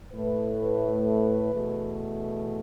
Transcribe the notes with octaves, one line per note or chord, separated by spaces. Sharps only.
A2 A3 B4
E2 B2 A3